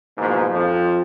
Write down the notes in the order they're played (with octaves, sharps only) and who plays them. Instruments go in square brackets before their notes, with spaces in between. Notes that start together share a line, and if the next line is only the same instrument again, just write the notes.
[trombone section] G#2 B2 E3 F3 G#3 A#3
F2 F3